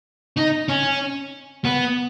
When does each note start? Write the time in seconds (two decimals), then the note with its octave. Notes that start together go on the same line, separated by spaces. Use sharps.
0.37 D#4
0.69 C#4
1.65 B3